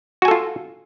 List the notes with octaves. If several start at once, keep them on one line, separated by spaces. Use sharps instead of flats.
F4 F#4 A4 G#5